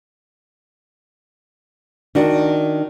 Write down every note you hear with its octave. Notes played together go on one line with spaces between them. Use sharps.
D#3 D4 F#4